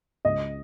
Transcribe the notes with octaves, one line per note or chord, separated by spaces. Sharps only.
C#2 D#5